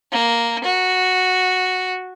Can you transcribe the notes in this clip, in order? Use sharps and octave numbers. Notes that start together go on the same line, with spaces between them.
A#3
F#4